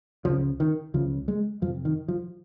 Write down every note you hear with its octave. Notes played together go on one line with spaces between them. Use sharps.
C#2 C#3 F3
D#3
C#2 C#3 F3
G#3
F2 F3
C3
D#3
F3